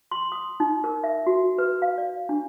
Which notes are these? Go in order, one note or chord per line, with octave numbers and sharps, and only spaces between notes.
C6
D#6
D#4
A#4
E5
F#4
B4
F5
D5
D4